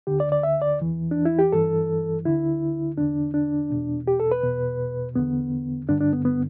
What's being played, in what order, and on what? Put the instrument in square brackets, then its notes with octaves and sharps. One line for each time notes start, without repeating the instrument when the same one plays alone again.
[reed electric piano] D2 D3 G4
D5
D5
E5
D5
E2 E3
D4
E4
G4
G2 E3 A4
D2 D3 E4
E2 D3 D4
D4
E2 B2
G4
A4
B4
E2 B2
E2 D3 B3
G2 D3 D4
D4
B3
B3